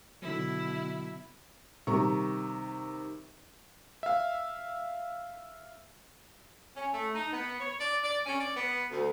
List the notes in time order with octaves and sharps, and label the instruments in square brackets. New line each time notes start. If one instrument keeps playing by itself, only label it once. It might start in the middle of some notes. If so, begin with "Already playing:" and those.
[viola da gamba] B2 E4 [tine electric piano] D3 F#3
[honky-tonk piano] C3 D#3 G3 A#5 C#6
[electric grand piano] E5 F5
[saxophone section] C#4
A3
D#4
B3
C#5
D5
D5
C#4
D5
B3
D2